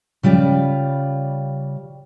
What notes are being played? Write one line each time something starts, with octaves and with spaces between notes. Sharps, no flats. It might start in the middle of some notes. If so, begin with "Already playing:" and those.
C#3 G3 F4 D5